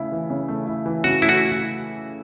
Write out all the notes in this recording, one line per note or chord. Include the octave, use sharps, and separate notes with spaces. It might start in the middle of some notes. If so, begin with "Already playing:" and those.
Already playing: C#3 A3 E4
E3
C#3
A3
E4
E3
C#3 F#4
A3 E4
F#4